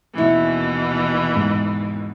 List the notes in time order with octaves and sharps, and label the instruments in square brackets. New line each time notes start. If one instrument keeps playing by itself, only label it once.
[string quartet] D#2 B2 E3 [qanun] C#4 E4
[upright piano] G#2